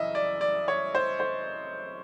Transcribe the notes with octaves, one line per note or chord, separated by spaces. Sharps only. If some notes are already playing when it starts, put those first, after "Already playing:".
Already playing: F#2 C#3 E3 D#5 E5
D5
D5
C#5
C5
C5